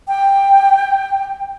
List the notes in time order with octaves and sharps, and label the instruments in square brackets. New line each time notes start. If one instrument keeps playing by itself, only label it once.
[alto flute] G5